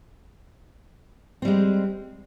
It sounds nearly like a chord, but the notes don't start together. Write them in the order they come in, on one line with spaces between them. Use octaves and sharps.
C4 G3 G#3